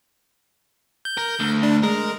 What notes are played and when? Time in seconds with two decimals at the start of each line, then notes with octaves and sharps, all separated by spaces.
1.05 G6
1.18 A#4
1.40 D2
1.63 D4
1.83 G#3 A#4